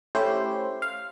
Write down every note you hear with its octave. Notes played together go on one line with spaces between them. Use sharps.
A3 C#4 E4 G4 C5
F5